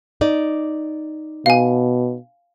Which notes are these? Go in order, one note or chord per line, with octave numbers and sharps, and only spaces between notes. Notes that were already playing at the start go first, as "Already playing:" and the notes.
D#4 D5
B2 F5 G#5